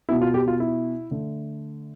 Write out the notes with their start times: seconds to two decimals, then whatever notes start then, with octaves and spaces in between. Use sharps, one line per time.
0.09 B2 B3 E4
0.21 F4
0.34 G4
0.48 F4
0.60 E4
1.11 D3 A3